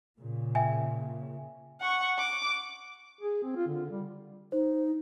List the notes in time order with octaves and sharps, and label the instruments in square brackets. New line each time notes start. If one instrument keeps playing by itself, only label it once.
[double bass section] A#2 C#3
[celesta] E5 G5 G#5
[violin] F#5 C#6
D6
[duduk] G#4
C4
F4
D3
G3
[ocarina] D#4 [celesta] C5